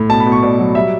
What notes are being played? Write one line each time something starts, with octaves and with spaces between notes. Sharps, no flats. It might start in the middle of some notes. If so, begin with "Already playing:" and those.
Already playing: A2
B2 A5
B5
B2
C#6
B2 D5
F#3
G3 E5